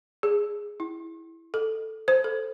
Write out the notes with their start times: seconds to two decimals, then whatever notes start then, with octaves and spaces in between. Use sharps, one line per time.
0.23 G#4
0.80 E4
1.54 A4
2.08 C5
2.24 A4